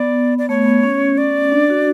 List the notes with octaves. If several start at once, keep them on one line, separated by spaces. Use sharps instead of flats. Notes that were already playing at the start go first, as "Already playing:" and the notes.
Already playing: B3 D5
D5
A3 C#5
B3
C#4
D5
D4
F#4